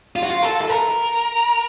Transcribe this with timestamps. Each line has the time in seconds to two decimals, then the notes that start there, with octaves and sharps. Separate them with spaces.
0.16 F4
0.23 F#4
0.30 F4
0.42 A4
0.62 A4
0.69 A#4